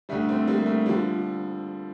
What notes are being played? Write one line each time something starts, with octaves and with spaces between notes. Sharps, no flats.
D2 D3 G3 A3
A3 C4
G3 A#3
A3
D3 F3 G3